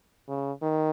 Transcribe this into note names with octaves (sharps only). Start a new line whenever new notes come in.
C#3
D#3